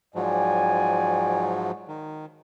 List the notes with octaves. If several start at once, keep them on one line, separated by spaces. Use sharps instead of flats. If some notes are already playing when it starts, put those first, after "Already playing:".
G#2 F3 F#3 D5 G5 G#5
D#3